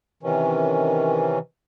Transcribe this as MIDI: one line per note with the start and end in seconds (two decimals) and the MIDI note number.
0.23 1.38 48
0.23 1.38 51
0.23 1.38 52
0.23 1.38 61